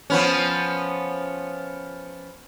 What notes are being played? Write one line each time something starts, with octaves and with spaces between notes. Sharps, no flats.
F3 B3 C#4